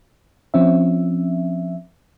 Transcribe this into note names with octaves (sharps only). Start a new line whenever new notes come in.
F3 C4 C#4 E5